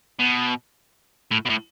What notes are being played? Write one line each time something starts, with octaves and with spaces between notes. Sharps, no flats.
B2
A2
B2
A2